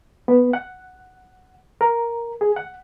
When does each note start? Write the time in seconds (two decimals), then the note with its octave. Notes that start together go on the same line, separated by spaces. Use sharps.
0.28 B3
0.53 F#5
1.81 A#4
2.41 G#4
2.56 F#5